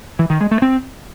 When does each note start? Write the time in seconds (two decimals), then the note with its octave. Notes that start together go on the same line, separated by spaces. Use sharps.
0.19 E3
0.30 D#3
0.41 G#3
0.51 A3
0.62 C4